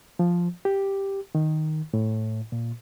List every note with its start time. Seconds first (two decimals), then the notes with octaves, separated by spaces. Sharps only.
0.19 F3
0.65 G4
1.35 D#3
1.94 A2
2.52 A#2